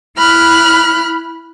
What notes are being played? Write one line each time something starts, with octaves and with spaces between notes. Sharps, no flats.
E4 B5 F6 F#6